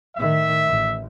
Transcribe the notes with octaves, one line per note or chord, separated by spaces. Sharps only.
A2 D#3 E5
A1